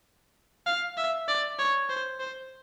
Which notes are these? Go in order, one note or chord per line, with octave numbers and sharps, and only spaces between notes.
F5
E5
D5
C#5
C5
C5